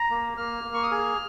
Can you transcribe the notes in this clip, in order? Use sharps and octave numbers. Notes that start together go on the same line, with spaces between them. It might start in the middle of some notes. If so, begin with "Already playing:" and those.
Already playing: A#5
A#3
A#3 F6
A#3
C#6
D#6
G#4 F6